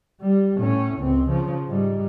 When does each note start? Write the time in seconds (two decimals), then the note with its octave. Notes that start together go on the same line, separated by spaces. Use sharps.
0.21 G3
0.57 A2 C#4
0.98 C#2 C4
1.28 C#3 F3
1.68 G#2 G3